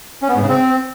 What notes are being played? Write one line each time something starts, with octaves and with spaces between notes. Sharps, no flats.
C#4
B3
G#2
C#3
C4